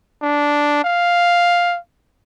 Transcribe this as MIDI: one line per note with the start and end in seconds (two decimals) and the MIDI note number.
0.22 0.82 62
0.84 1.78 77